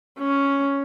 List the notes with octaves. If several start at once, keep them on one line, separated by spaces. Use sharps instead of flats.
C#4